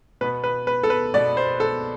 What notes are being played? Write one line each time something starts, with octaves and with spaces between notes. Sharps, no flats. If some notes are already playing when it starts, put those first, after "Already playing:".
B2 B3 B4
B4
B4
A4
B4
B2 B3 D5
C5
A4